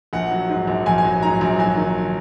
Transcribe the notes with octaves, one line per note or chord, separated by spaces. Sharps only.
A#1 F#5
F#3
G#2
A#1
A#1 G#5
G#5
F#3
G#2 A#5
A#1
F#3 G#5
D#3